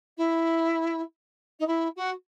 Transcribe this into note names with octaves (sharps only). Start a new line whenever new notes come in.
E4
D#4
E4
F#4